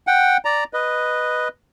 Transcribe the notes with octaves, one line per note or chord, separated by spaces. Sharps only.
F#5 G5
D5 A#5
B4 D#5